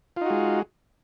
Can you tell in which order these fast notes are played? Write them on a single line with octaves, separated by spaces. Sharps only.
F4 D#4 F#4 G#3